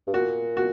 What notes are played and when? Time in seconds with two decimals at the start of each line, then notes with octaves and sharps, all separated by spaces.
0.07 G2
0.14 A#2 F#4
0.57 F#4